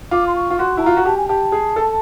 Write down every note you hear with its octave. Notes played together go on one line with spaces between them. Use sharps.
F4 D6
C6
C#6
F4
F#4 C6
E4 A5
F4 A#5
F#4
G4 A5
G#5
G4 A5
G#4
A4